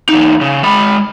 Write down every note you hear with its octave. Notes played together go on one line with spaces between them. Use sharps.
E2 D#4
C#3
G#3 B5